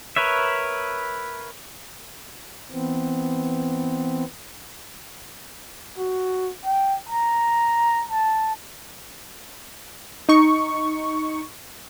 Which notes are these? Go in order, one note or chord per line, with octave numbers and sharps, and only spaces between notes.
A#4 B4 C#5 E5
E3 B3 C4
F#4
G5
A#5
A5
D#4 C#6